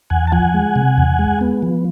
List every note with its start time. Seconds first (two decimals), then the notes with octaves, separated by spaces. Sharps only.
0.10 E2 F#5 G#5
0.27 A5
0.32 F3 F#5 G#5
0.54 G#3
0.76 C3
0.98 E2
1.19 G#3
1.41 B3
1.63 F3